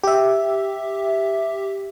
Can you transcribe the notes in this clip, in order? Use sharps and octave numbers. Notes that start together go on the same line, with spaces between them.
G4 E5